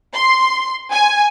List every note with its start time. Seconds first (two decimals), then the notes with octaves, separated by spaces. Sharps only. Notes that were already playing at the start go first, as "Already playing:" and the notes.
0.14 C6
0.91 G#5